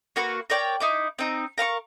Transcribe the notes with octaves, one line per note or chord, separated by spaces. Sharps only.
A#3 F#4 B4 C#6
A#4 C#5 D5 G5
D#4 E4 D6
C4 D#4
A#4 F5 C6 C#6